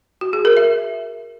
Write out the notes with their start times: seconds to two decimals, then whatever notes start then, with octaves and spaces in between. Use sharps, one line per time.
0.21 F#4
0.33 G#4
0.45 A#4
0.57 E5